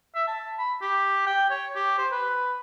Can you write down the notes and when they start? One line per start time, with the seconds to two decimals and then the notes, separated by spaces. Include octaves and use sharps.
0.15 E5
0.27 A5
0.58 B5
0.82 G4
1.26 G5
1.50 C#5
1.76 G4
1.98 C5
2.12 B4